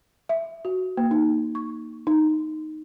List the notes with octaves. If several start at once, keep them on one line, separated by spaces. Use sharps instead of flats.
E5
F#4
A#3
D#4
C#6
D#4